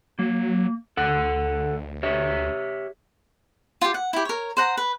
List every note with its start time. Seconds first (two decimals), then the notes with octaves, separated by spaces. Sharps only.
0.19 F#3 A#3
0.97 D2 A4 F#5
2.03 G4 C#5 E5
3.81 F4 G4
3.94 F#5
4.13 E4 G4
4.25 A#4 C#5
4.57 C5 F#5 A#5
4.77 B4